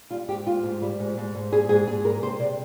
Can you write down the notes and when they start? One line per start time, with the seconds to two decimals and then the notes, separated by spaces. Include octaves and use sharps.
0.10 G3 F4
0.29 G#2 G4
0.47 G#2 F4
0.63 G#2
0.82 G3
1.00 G#2
1.17 G#2
1.35 G#2
1.52 G3 G#4
1.69 G#2 G#4
1.87 G#2 G#4
2.04 G3 A#4
2.22 C3 C5
2.40 C3 D5